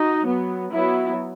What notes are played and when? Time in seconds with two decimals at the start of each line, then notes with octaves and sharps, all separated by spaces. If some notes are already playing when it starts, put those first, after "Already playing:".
Already playing: D#4 F#4
0.22 F#3 B3
0.72 F#3 B3 E4